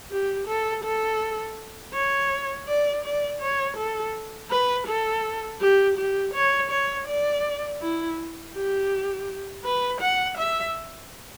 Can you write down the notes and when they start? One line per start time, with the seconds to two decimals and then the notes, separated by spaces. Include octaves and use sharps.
0.11 G4
0.47 A4
0.84 A4
1.94 C#5
2.67 D5
3.04 D5
3.40 C#5
3.77 A4
4.50 B4
4.88 A4
5.61 G4
5.97 G4
6.34 C#5
6.71 C#5
7.07 D5
7.81 E4
8.54 G4
9.64 B4
10.01 F#5
10.38 E5